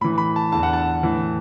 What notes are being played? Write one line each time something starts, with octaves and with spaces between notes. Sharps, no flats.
A2 E3 B5
B5
A5
E2 D3 A5
F#5
A5
A2 E3